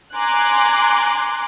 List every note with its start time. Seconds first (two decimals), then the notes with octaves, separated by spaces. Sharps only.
0.15 G#5 A#5 C6 D6 F#6